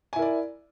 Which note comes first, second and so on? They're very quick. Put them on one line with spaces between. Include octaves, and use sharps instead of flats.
G#5 E4 A#4 D5